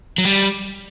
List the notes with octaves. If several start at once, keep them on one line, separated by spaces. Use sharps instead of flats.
F#3
G3